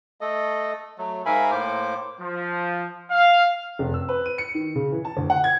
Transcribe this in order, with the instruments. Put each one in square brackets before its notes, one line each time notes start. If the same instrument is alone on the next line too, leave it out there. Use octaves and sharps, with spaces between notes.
[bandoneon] A3 A4 D#5
F#3 A3
G#2 A#4 E5 F5 G#5 B5
A2 A#3 C5 D6
[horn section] F3
F5
[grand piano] F1
E6
B4
D#7
C#7
D#3
C#3
E3
A5
D2
F#5
G#6